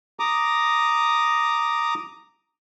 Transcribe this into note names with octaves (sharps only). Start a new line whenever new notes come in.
A#5 D6 D#6